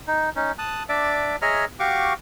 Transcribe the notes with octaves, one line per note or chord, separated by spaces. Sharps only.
D#4
C#4 D#4
A5 D#6 F#6
D4 D5 E5 D6
G#4 C#5 D#5 E5 A#5 F6
F#4 G4 F5 C#6 D6